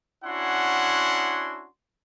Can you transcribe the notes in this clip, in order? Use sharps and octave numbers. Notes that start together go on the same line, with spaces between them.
C#4 D4 E4 F#4 F#5 C6